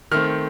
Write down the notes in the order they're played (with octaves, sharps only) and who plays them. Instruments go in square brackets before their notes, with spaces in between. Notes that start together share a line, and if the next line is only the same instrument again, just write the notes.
[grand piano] D#3 A3 C4 F6